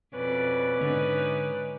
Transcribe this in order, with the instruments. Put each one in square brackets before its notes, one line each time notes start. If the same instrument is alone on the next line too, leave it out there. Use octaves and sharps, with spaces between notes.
[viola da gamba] F2 B2 D5 [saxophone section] C#4 B4
[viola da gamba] G#2 D#4 D5 [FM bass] D3